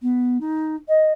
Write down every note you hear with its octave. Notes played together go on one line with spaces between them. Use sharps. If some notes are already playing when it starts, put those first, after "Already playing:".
B3
D#4
D#5